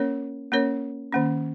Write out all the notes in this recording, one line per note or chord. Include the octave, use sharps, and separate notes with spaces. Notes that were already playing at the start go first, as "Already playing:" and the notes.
Already playing: A#3 C#4 A#4 C#5
A#3 C#4 A#4 C#5
D#3 A#3 C#4